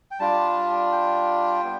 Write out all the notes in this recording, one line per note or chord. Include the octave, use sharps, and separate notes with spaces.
G5
G3 D4 F4 A5
G5
B3